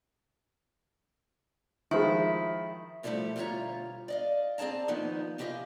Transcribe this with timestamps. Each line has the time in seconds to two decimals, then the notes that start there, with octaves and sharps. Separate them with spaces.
1.91 D#3 F3 G#3 E4
3.03 B2 D3 F3 G3 A3 E4
3.36 D2 B2 G3 F4 C#5 A#5
4.08 D5 D#5 F5
4.58 C4 G#4 D5 A5 A#5
4.88 D#3 F3 A#3 B3 D#4
5.38 C#3 E4 G4 B4 D#5 F5